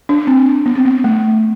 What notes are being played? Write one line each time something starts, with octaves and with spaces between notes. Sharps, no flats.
D4
C4
B3
C4
B3
A3